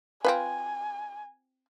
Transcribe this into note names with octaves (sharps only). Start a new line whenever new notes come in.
C4 F4 B4 G#5